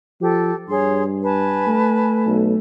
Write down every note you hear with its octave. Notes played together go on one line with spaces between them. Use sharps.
F3 G4 A4
G2 G#4 C#5 C6
B4 G#5 A5
A3
B1